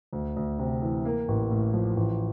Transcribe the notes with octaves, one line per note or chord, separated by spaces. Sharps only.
D2
D2
C3
E3
A#3
A1
A2
F3
A1